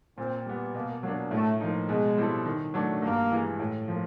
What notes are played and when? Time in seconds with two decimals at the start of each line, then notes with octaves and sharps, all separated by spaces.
0.17 A#2 C4
0.46 G3 B3
0.75 B2 A#3
1.03 F#3 A#3 D4
1.31 A2 A3
1.60 F3 A#3 D#4
1.89 B2 G#3
2.17 G3 C4 E4 A4
2.45 D#3
2.74 F#3 A3 D4
3.02 G2 A#3
3.31 E3 G#3
3.60 A2
3.88 F3 A#3